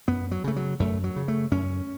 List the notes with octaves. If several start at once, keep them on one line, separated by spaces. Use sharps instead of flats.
F#2 B3
F#3
C#3 A3
F#3
F#2 A3
F#3
C#3
A3
F#2 C#4